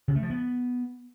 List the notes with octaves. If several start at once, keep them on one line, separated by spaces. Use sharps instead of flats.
C#3
A3
F3
B3